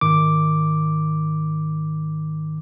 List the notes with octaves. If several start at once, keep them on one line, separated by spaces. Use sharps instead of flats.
G#2 D#3 D6